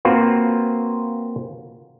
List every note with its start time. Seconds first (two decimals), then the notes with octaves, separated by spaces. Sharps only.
0.05 A#3 C4 F4 F#4 B4